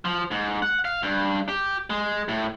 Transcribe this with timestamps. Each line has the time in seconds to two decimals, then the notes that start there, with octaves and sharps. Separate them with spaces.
0.05 F3
0.31 G#2
0.62 F#5
0.85 F5
1.03 G2
1.49 G4
1.90 G#3
2.28 A2